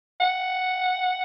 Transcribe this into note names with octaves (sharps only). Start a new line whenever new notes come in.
F#5